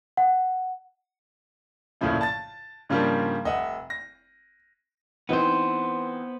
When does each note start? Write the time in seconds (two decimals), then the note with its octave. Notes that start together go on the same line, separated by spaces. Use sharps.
0.17 F#5
2.01 A#1 F#2 A2 C#3 F3 E4
2.21 A5 A6
2.89 G#2 C#3 F3 G3 A#3 D4
3.45 F1 D#5 E5 F#5
3.90 A#6
5.29 E3 B3 C4 D#4 C5